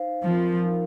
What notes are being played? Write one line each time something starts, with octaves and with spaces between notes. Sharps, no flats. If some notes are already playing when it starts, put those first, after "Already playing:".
Already playing: D#4 C5 F5
F3 C4 F4 A#4
D#4 A#4 F5